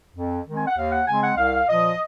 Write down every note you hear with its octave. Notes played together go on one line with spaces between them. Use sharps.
F2
D#3 G#3 C4
G#5
F#5
D#2 F5
F#5
C#3 G#3 C4 G#5
F#5
C2 F5
A#2 F3 D#5